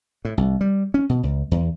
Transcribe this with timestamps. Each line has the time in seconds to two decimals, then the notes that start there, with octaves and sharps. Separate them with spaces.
0.25 A2
0.38 C2
0.61 G3
0.94 C#4
1.09 B2
1.23 C#2
1.51 E2